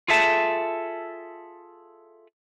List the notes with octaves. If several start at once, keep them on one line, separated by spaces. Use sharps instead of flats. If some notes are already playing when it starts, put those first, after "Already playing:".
F4 G#4 A4 E5 A5